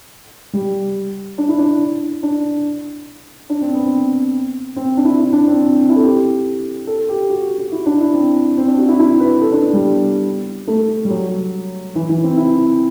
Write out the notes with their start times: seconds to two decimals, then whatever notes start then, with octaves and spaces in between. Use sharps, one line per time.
0.53 G3
1.38 D4
1.48 E4
1.58 D4
2.23 D4
3.50 D4
3.61 C4
3.74 B3
3.86 C4
4.76 C4
4.97 D4
5.05 E4
5.19 E4
5.33 D4
5.47 C4
5.60 C4
5.75 C4
5.89 E4
5.96 A4
6.03 G4
6.87 A4
7.09 G4
7.30 F#4
7.58 F#4
7.72 E4
7.86 D4
8.00 E4
8.14 C4
8.58 C4
8.68 D4
8.78 F#4
8.88 E4
8.99 E4
9.20 B4
9.41 A4
9.52 D4
9.62 B3
9.73 G3
10.67 A3
11.05 G3
11.10 F#3
11.95 E3
12.09 E3
12.24 C4
12.37 E4